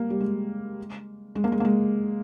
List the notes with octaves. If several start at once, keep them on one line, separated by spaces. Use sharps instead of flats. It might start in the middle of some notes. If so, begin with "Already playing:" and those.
Already playing: G3 A#3
G3
G#3
G#3
A#3
G#3
A#3
G#3